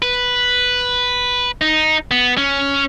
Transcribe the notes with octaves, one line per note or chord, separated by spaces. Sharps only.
B4
D#4
B3
C#4